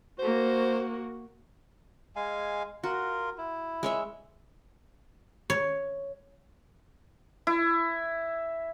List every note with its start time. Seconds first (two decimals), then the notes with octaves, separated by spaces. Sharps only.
0.19 A#3 F#4 C5
2.16 G#3 F5 G#5
2.84 F4 F#4 A#4
3.38 E4
3.83 G#3 C#5 E5
5.50 C#5
7.47 E4